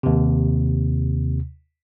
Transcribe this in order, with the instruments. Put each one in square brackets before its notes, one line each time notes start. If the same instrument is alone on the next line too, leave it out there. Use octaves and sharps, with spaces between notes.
[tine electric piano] D#2 C3